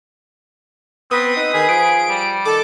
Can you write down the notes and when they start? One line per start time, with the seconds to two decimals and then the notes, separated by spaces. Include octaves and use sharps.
1.11 B3 C4 B4 D#6
1.36 D#4
1.54 D#3 G#4
1.69 F3 D7
2.09 G3
2.45 D#3 A4 D6